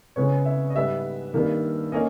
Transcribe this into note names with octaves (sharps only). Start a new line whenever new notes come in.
C#3 G#3 B3 C#5
E5
D#5
G#2 G3 B3 E5
G2 D#3 A#3
A#3 C#4 D#5